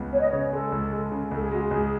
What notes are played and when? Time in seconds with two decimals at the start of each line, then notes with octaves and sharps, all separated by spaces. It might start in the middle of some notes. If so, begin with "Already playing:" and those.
Already playing: C#2 B3
0.13 B3 C#5
0.21 D#5
0.28 C#3 C#5
0.52 G#3 A4
0.72 C#2
0.92 G#3
1.12 C#3
1.31 C#2 A4
1.42 G#4
1.51 G#3 F#4
1.62 G#4
1.71 C#2